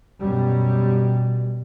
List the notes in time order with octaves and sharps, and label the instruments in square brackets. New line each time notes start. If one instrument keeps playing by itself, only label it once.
[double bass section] F#2 B2 G3